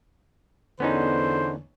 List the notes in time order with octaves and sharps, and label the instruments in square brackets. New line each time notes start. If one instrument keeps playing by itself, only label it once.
[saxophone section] E2 D3 [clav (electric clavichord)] B3 C#4 D#4 [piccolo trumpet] C5